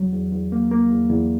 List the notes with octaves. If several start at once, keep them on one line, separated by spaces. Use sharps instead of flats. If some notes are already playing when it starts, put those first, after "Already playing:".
Already playing: E2 F#3
E2
E2
A#3
A#3
E2
E2